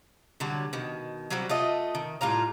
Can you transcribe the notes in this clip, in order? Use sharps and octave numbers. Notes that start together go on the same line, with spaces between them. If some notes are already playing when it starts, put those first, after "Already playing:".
D3 F#3 G3 F#4
B2 D#3
F#3 G3 C4 F#4
A3 F4 D#5
D#3
A2 G3 F4 A#5